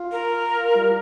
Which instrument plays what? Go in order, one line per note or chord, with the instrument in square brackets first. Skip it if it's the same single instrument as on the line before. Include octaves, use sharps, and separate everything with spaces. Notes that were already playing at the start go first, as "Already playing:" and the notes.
Already playing: [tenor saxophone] F4
[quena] A#4
[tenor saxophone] G3